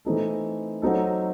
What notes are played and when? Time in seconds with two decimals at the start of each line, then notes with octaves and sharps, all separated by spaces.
0.05 E3 A3 C4 D#4 A4
0.82 F#3 C4 D#4 A4